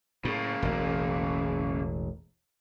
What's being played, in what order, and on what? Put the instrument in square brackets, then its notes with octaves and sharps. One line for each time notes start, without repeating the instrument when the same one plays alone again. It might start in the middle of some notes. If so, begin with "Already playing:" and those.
[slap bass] A2 [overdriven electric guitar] C#3 A#3
[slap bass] E1 A1